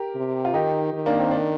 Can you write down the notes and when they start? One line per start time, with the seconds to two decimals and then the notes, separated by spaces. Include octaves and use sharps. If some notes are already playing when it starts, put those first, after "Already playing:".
Already playing: G4 A#4
0.15 C3
0.45 F4
0.54 D#3 D#4 G4
0.93 D#3
1.06 A#3 D4
1.20 C4
1.31 D4